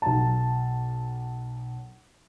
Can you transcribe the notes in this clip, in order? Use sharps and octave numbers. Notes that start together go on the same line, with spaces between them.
B1 A5